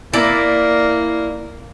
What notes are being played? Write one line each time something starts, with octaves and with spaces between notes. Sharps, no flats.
A#3 E4 D5 A#5